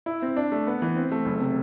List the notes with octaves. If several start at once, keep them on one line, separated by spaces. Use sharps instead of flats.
E4
C4
D4
A3
B3
E3
C4
A3
F#1
C3